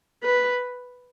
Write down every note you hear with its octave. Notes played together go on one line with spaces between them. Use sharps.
B4